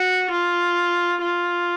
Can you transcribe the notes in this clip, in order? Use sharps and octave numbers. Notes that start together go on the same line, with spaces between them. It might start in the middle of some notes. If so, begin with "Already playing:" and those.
Already playing: F#4
F4
F4